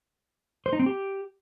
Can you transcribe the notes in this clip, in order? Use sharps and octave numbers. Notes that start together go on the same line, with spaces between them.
C5
D#4
C4
G4